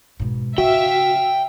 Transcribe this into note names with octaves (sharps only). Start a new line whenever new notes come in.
G#2 B2
C#3 F#4 E5 F5 G5